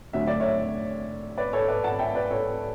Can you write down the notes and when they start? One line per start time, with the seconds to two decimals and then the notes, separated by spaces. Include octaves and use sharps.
0.13 D2 D3 F#3 E5
0.27 D5
0.40 C#5 E5
1.38 B4 D5
1.53 A4 C#5
1.68 B4 D5
1.84 F#5 A5
1.99 E5 G5
2.15 B4 D5
2.31 A4 C#5